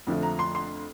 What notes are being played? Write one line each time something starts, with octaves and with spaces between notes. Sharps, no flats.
F2 D3 F3 A3
A#5
C6
C6